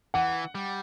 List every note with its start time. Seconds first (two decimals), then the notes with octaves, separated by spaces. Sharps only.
0.14 E3 F#5
0.55 G3